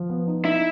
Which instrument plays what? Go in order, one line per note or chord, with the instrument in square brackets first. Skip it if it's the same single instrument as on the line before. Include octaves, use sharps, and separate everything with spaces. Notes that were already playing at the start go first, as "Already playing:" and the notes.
Already playing: [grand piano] F3
B3
D#4
[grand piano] D#4 [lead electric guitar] E4